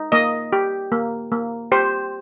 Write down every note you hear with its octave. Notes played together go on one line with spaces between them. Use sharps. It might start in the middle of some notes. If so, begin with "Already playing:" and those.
Already playing: D#4
A#3 D#5
G4
A#3
A#3
G4 C5